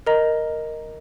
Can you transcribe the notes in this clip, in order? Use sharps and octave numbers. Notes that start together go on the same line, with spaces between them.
A#4 D#5 A#5